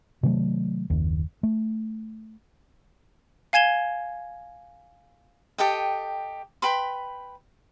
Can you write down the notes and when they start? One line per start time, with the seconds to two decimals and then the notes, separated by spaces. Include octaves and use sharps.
0.23 C3 D#3 F#3 A3
0.90 F#1 D#2
1.43 A3
3.53 F5 G#5 G#6 E7 G7
5.58 G4 A4 D#5 G5
6.62 B4 G5 B5 C6